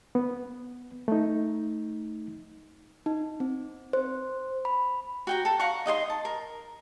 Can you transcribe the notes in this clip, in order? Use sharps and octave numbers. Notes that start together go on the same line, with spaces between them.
B3
A3 D#4
D#4
C4
C5
B5
F#4 G5 A#5
A4
F5 F#5 A#5 C#6
D#4 D#5 G5 C6
A5
A#4